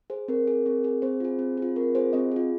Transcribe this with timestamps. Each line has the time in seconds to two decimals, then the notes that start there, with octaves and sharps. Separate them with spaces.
0.10 G#4 C5
0.28 C4 A#4
0.47 G#4
0.66 C4
0.84 G#4
1.02 C4 C5
1.20 F4 G#4
1.39 C4
1.57 F4 G#4
1.76 C4 A#4
1.95 F4 G#4 C5
2.13 C4 D#5
2.31 F4 G#4